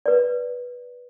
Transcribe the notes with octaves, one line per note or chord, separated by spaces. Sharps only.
B4 D5